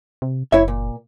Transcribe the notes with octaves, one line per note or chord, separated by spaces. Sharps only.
C3
F#1 E4 C#5 E5
A#2